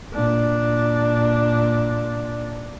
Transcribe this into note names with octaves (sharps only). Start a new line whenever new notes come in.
A#2 D4